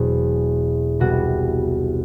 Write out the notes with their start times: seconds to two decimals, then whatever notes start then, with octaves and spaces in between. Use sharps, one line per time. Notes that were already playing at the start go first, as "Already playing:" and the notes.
Already playing: E1 E2 B2 F#3 C4
1.00 C2 B2 G3 B3 F#4